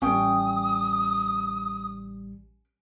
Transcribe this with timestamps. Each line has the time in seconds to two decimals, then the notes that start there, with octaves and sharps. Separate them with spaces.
0.02 A1 G3 C#4 G5 D#6